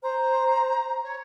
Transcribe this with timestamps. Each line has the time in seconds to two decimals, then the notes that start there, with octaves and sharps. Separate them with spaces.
0.03 C5 A#5
1.02 C#5